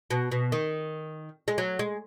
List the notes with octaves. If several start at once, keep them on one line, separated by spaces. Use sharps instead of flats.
B2
B2
D#3
G#3
F#3
G#3